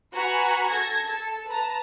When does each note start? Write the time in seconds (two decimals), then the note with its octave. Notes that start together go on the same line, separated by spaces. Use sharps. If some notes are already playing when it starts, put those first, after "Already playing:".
0.13 F#4 B4 G#5 A#5 B5
0.68 A4 G#6 A#6
1.06 A4
1.48 B4 A5 A#5